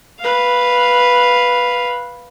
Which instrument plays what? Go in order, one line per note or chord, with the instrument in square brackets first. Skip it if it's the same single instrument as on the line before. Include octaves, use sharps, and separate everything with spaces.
[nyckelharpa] B4 F5